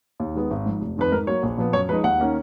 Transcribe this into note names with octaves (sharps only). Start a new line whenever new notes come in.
D#2
D#3 G#3 B3
G#1
G#2 F3
F1
F2 D#3 B4
G#2 A#4
F#3 A#3 C#5
A#1
A#2 F3 B3
F#2 C#5
F3 G#3 D#4 B4
D#2 F#5
D#3 A#3 C#4